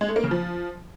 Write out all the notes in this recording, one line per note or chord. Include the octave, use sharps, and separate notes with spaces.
G#3
A3
A#3
C#3
F3